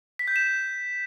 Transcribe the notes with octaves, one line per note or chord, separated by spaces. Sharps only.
B6
G6
E7